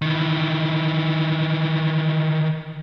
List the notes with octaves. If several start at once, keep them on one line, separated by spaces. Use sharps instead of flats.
D#3 E3